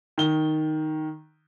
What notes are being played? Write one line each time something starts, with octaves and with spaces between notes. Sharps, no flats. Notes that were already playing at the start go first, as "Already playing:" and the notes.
D#3 G7